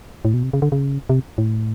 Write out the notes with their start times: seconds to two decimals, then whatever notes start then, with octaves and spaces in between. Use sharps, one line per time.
0.25 A2
0.34 B2
0.43 C3
0.53 C#3
0.62 D3
0.72 C#3
1.09 C3
1.38 A2